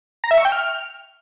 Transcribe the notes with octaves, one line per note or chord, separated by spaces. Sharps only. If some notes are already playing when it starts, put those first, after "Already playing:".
A#5
E5
C#6
G5
F6